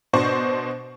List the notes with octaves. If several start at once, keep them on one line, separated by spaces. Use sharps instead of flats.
B2 D4 C5 C#6